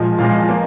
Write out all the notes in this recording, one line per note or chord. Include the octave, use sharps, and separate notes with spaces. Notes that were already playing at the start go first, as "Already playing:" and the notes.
Already playing: A#2 F3 G#3
A#2 F3 G#3 F5
A#3